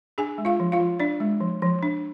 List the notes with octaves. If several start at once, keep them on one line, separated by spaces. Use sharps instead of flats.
D4 G#4 G#5
G#3
F4 F5
F3
F4 F5
F3
D4 D5
G#3
F3
F3
D4